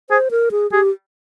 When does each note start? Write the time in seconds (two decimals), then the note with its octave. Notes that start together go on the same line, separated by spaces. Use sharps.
0.10 G#4 C5
0.31 A#4
0.51 G#4
0.72 G4 G#4